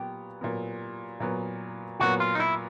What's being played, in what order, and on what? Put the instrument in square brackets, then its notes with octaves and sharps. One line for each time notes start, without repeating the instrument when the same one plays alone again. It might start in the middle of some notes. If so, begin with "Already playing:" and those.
Already playing: [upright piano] A#2 F#3 B3 [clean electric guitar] G4
[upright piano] A#2 F#3 B3
A#2 F#3 B3
[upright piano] A#2 F#3 B3 [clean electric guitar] F#4
[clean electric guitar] F4
D#4
E4